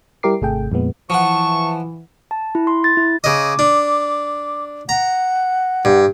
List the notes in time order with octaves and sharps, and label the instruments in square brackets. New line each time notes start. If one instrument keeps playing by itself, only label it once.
[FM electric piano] G3 E4 G4 A#4 D6 C7
G#1 C3 A3 G#4 A4 G5
F2 A#2 G#3 B3
[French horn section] E3 [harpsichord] F3 F#5 [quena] A5 [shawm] C#6
[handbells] A5
E4
C6
A6
E4
[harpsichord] C#3 D#5 [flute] D6
[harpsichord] D4
[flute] F#5 [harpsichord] A#5
[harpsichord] G2